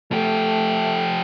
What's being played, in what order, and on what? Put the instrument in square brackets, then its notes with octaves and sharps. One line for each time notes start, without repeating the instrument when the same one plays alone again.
[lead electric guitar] F3 G4 [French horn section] A3